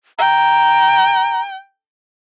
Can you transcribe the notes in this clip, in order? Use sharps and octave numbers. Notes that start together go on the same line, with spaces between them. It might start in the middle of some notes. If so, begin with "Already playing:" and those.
G5 A#5